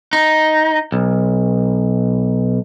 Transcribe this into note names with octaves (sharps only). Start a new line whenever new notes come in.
D#4
B1